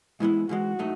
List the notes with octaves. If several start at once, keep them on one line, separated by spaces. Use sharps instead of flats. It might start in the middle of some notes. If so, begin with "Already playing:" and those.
G#2 E3 G#3 B3 E4
G#2 E3 G#3 F#4
A2 F#3 A3 D#4